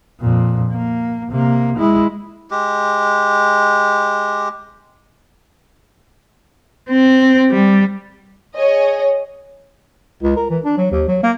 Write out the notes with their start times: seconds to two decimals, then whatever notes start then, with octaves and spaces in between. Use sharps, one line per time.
0.21 F2 A#2
0.73 A#3
1.31 C3 A#3
1.78 G#3 E4
2.51 G#3 G4
6.89 C4
7.50 G3
8.56 G#4 C#5 D#5
10.23 C#2
10.36 A#4
10.50 E3
10.64 D4
10.78 F#3
10.91 D#2
11.08 F#3
11.23 A#3